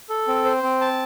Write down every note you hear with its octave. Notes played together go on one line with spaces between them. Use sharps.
A4
C4
C5
C4
A5